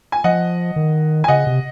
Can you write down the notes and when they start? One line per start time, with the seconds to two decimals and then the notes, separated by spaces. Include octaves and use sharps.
0.12 G#5
0.24 F3 D#5 F#5
0.76 D#3
1.24 G#5
1.28 C#3 D#5 F#5
1.47 C3